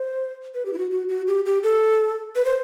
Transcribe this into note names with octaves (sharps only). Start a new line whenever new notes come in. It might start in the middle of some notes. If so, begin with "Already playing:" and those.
Already playing: C5
B4
G4
E4
F#4
F#4
F#4
G4
G4
A4
B4
C5